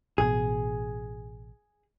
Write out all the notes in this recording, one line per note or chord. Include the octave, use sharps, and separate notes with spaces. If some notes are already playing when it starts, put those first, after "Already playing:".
A1 B2 G#4